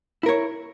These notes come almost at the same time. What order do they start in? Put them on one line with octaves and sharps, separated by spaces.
E4 A#4 C#5